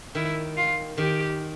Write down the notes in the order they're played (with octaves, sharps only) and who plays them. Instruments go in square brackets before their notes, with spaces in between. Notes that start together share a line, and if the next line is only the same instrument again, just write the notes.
[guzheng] D#3 [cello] E4
[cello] F4
[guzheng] D#3 [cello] G4